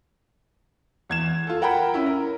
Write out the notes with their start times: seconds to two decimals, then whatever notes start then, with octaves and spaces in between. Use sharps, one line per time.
1.10 E2 G#6 E7
1.47 F4 A4
1.62 A#4 F#5 G5 A#5 B5
1.94 C#4 E4
2.06 A#4